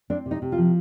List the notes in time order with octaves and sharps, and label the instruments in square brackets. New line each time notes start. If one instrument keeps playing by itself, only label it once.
[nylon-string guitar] C4 D4
C3
D#4
C3
F4
F3